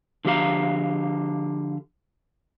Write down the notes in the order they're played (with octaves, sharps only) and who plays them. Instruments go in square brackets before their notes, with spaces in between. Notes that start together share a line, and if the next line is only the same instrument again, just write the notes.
[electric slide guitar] D3 F3 G4 A4 F5 A#5